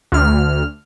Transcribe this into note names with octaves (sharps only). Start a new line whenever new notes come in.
D2 F6